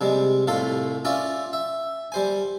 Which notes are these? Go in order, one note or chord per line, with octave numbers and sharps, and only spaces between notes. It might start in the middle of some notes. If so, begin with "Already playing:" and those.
C3 G3 G#3
C2 A2 F4 A4 C6
C#4 F4 D5 E5
E5
G3 C5 G#5